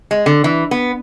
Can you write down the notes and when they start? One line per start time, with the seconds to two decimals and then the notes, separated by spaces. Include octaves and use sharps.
0.11 G#3
0.26 D3
0.44 E3
0.71 B3